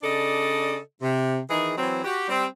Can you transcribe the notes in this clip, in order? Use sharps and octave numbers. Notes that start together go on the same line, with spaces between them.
C#3 D4 A4 D5 D#5
C3
D#3 E3 D#4 G#4
E3 F#3 C4
F#4 G4
G3 C4